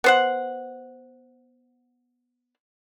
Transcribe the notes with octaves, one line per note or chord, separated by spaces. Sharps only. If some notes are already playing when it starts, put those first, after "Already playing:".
B3 C5 F#5